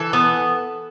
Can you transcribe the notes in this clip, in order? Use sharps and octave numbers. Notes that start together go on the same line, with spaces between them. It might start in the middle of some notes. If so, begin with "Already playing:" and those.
Already playing: E3 A4
B3